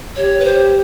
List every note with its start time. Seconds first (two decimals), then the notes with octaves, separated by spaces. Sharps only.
0.16 G4 C#5
0.40 B4
0.44 C5